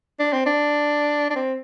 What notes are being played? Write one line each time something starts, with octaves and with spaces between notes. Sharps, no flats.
D4
C4
D4
D4
C4